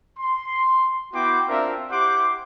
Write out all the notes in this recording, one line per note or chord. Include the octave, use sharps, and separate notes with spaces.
C6
B3 E4 F#4 G5 C6 D6
C4 D4 F4 A#4 E5
E4 G4 C5 F#5 C6 D6